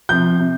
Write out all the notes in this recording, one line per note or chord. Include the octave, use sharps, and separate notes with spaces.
C3 F3 G6
C3